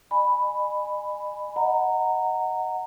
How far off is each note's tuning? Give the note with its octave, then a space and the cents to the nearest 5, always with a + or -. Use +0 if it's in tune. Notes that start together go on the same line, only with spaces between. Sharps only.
D#5 -40 G#5 +0 B5 +0
D#5 +0 F#5 +0 A#5 -15